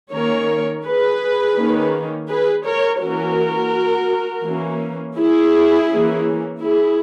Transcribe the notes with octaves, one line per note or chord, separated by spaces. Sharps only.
D#3 A#3 C#4 A#4 C#5
G#4 B4
D#3 A#3 C#4
G#4 B4
A#4 C#5
E3 A#3 C#4 F#4 A#4
E3 A#3 C#4
E4 G#4
E3 A#3 C#4
E4 G#4